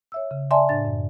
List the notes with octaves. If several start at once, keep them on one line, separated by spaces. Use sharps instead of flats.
C#5 E5 E6
C#3
D5 E5 G#5 A5 C6
A2 D4 A6
F#2